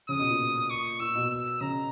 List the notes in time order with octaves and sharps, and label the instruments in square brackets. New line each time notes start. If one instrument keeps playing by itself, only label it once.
[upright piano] C#3 [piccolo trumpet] D#6
[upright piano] B2
A#2
[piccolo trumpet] C#6
[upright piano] A#2 [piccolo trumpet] E6
[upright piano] B2
[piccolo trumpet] E6
[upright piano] C#3 [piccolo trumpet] A#5